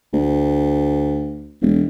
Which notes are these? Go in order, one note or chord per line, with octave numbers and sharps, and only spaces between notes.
D2
E1